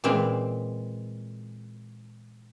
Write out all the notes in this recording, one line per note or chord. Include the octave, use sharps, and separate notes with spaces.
A#2 E3 G#3 C4